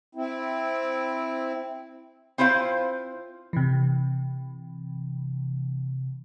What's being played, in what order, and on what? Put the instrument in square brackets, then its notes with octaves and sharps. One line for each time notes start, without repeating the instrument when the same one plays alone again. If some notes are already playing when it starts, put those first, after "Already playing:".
[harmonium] C4 E4
[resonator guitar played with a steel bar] C4 E4 F4 C5 F5
[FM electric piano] C3 E3